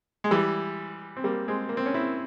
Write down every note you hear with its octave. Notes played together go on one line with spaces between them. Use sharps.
G#3
E3 G3
C4
G3 A#3
G#3 C4
A#3
C4
C#4
C4 E4